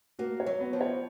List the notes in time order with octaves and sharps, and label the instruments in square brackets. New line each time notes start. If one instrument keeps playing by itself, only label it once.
[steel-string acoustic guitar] A#3 [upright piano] F#4
[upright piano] C#5
[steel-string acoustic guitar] F#3
[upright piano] B3
[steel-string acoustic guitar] F3
[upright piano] C#5